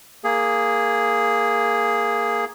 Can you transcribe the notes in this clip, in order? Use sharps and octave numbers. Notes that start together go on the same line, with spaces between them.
A#3 G#4